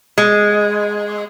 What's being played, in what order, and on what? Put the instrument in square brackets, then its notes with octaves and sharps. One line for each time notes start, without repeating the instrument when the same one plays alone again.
[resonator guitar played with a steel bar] G#3